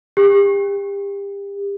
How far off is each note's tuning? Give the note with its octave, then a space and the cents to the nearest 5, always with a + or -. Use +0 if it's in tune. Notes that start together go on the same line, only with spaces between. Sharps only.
G4 +30